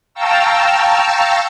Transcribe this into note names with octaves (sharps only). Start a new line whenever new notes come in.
F5 G5 A5 A#5 C#6 E6